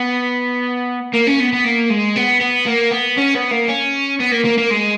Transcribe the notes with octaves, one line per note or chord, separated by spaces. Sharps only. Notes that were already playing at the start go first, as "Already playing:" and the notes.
Already playing: B3
A#3
C#4
B3
B3
A#3
G#3
B3
B3
A#3
B3
C#4
B3
A#3
C#4
B3
A#3
A#3
A#3
G#3